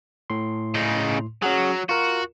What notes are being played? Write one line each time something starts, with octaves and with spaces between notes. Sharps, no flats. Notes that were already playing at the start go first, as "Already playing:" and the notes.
A2 C6
C#3 D#4
F#3 C#4 F#4 G#4
F4 F#4 A#4